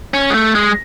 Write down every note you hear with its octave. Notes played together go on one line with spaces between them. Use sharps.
C#4
G#3
A3
G#3